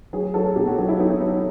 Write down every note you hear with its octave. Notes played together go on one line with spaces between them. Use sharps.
F#3 G#4
F#3 A4
B1 G4
F#4
F#3 F#4
E4
F#3 D#4
E4
F#3 D#4